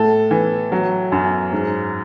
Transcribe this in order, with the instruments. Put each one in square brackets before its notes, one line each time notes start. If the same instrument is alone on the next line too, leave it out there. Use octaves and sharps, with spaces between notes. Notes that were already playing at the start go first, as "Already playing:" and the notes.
Already playing: [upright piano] A2 A4
E3
F#3
F#2
G#2